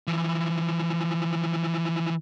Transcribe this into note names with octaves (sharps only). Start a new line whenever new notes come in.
E3 F3